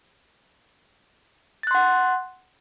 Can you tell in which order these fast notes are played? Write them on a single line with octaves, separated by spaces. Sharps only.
A6 F#6 C6 F#5